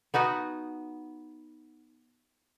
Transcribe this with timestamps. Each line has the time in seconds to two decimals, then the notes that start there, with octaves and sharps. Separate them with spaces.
0.14 B3 D#4 F#4 B4